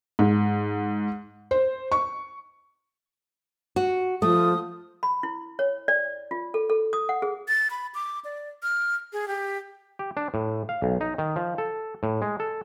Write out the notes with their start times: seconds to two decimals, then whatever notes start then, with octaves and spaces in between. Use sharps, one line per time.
0.19 G#2
1.51 C5
1.92 C#6
3.76 F#4
4.22 F3 A3 D#6
5.03 B5
5.23 E4
5.59 C#5
5.88 D5
6.31 F4
6.54 A4
6.70 A4
6.93 D#6
7.09 F#5
7.22 G#4
7.48 A6
7.71 B5
7.95 D6
8.25 D5
8.63 F6
9.13 G#4
9.28 G4
9.99 G4
10.17 D4
10.34 A2
10.69 F5
10.82 B1
11.01 D#4
11.18 D#3
11.36 F3
11.58 A4
12.03 A2
12.22 G#3
12.40 A4